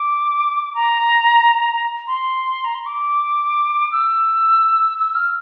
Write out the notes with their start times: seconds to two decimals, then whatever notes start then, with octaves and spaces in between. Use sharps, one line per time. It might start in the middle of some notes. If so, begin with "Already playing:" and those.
Already playing: D6
0.75 A#5
2.07 C6
2.64 A#5
2.75 C6
2.86 D6
3.92 E6
4.98 E6
5.15 F6